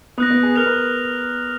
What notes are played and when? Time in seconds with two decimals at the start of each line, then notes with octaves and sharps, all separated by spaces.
0.18 B3 D#6 F#6 A#6
0.31 B3
0.43 G#4
0.56 A#4 F6 A#6 F7
0.66 B4